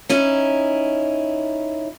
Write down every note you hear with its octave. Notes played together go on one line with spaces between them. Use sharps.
C#4 D#4 E4